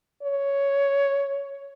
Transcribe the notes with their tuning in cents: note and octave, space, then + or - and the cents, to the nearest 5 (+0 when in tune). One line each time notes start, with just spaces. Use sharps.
C#5 +5